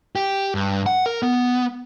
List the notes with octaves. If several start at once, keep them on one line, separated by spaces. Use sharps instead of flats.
G4
G2
F#5
A#4
B3